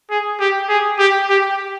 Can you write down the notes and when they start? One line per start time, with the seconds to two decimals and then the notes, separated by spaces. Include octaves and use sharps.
0.10 G#4
0.40 G4
0.69 G#4
0.99 G4
1.30 G4